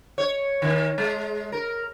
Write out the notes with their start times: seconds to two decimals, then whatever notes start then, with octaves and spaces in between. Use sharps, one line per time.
0.18 C#5
0.62 D#3
0.98 G#3
1.52 A#4